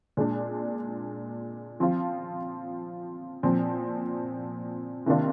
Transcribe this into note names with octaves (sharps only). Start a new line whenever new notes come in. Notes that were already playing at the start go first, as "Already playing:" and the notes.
A#2 G#3 D4
F3 C4 F4
A#2 F3 C4
C3 D#3 A#3 D4 F4